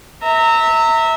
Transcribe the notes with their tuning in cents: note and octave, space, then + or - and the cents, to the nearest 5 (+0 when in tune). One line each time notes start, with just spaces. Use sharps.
E5 -20 A#5 -30